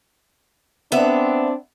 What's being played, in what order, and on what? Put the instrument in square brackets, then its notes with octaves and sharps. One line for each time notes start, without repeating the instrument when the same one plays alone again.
[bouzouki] B3 E5 [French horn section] C4 D4